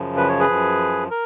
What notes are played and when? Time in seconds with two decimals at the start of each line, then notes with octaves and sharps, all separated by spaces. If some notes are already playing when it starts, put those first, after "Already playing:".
Already playing: F#2 C#3 F3
0.17 B4
0.29 C#5
0.40 G#4 B4
0.48 F#2 F3
1.11 A#4